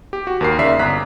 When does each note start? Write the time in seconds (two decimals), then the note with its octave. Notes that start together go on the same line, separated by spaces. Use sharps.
0.13 G4
0.27 F#4
0.41 D#2 A#4 C7
0.58 D#2 C#3 D#4 D5 E5 C7
0.79 G1 A#5 F#6 B6